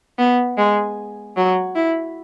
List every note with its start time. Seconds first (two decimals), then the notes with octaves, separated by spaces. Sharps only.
0.18 B3
0.58 G#3
1.37 F#3
1.75 E4